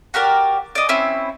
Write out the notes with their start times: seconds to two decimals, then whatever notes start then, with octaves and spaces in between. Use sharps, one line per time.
0.14 F#4 G4 A#4 D5
0.75 D5 D#5
0.89 C4 C#4 E4